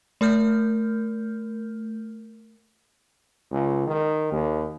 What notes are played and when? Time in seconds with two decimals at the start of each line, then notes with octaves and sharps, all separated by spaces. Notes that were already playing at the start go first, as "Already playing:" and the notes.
0.21 A3 A#4 F6 G6
3.51 C#2
3.87 D#3
4.32 D#2